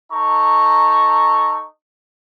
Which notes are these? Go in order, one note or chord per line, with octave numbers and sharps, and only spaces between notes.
D#4 A4 A#5 C#6